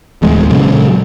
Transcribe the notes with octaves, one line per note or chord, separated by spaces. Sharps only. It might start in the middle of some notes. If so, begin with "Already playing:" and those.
D1 E2 G#3
A#2 C#3 F#3